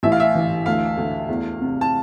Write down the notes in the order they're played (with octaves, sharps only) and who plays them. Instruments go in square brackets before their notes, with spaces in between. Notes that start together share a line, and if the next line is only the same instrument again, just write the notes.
[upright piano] A1 [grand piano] E5
[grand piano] F5
E5
[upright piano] E3
[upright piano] D2 [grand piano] F5
[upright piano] D2
E2
C3
[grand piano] A5